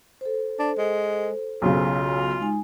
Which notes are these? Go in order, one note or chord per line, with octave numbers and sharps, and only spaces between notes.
A4 C5
D4
G#3
B1 C#3 F4
G#3 D#4 G#5